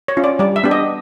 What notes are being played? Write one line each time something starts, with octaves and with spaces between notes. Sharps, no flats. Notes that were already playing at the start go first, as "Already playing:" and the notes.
C#5
C#4 F4
D5
G3 D5
E5
B3 D4 G4
D#5